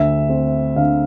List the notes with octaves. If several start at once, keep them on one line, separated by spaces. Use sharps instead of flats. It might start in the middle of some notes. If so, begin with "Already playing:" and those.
Already playing: D2 E5
C4
D3 F5